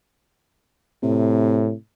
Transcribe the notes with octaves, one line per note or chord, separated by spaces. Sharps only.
A2 C3